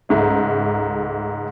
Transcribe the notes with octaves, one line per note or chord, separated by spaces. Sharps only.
C#2 G#2 A3